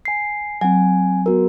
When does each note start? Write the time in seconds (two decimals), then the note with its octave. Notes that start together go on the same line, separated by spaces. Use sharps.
0.05 G#5 C7
0.61 F#3 C4 F#5 G#5
1.26 B3 F#4 A#4